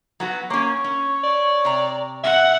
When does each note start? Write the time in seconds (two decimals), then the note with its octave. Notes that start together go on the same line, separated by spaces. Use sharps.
0.20 F#3 B3 F#4
0.50 A#3 C#4 C#5
0.84 C#4
1.23 D5
1.65 C3 A#5
2.24 E5 F#5